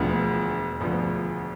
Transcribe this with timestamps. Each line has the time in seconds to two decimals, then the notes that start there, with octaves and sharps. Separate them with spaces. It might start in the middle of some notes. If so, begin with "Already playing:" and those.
Already playing: E1 D2 D3 F3 B3
0.80 E1 D2 D3 F3 B3